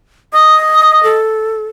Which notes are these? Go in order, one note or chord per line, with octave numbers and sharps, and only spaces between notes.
D#5 D#6
A4